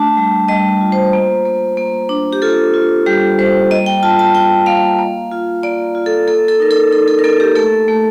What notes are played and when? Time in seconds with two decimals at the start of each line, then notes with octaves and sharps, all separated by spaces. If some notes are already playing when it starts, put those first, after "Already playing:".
Already playing: A3 D4 A5
0.17 G3
0.48 G3 D#5
0.81 F4
0.92 C5
1.13 A#3
1.45 A#3
1.77 A#3
2.09 D4
2.33 G4
2.42 F4 A4
2.74 F4
3.06 G3 G4
3.39 G3 C5
3.71 A#3 D#5
3.86 G5
4.03 F4 A5
4.19 A5
4.34 F4 G5
4.66 A#3 F5
4.99 A#3
5.31 F4
5.63 A#3 D5
5.95 F4
6.06 A4
6.28 A#3 A4
6.48 A4
6.60 D#4 A#4
6.71 A4
6.91 D#4 A4
7.08 A4
7.19 A#4
7.24 A#3 A4
7.40 G4
7.56 A3 A4
7.88 A3